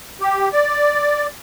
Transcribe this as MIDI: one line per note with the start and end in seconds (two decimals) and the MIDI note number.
0.21 0.49 67
0.53 1.27 74